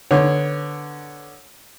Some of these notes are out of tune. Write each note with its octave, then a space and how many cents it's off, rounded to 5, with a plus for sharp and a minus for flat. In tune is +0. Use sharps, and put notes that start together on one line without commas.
D3 +5 B3 +0 C#5 +0